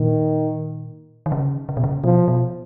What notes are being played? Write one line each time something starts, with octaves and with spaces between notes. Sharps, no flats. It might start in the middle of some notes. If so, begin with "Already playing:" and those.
Already playing: A#2 D#3
D#3
C#3
C#3
B2
C#3
B2 F3
B2